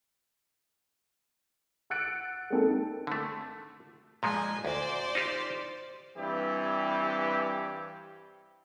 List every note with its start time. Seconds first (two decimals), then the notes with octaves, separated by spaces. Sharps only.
1.90 F#5 E6 F#6 A6 C#7 D7
2.50 G#3 A#3 C4 D#4 A4
3.07 D3 A3
4.23 A#2 F3 G#3 D#5 G#5
4.65 D2 C5 D5
5.15 D#4 F4 G4
6.16 G2 E3 G3 C4 G4